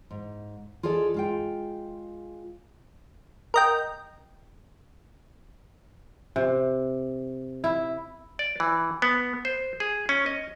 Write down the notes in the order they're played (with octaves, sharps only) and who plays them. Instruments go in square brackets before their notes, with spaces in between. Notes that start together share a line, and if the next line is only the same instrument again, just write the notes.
[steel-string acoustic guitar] G#2
F4 G#4 A4 D5 D#5
G#3 F4 G5
[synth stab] A#4 D#5 G5
[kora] C3
E4
[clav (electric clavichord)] D5
E3
B3
C5
G#4
C#4
D#5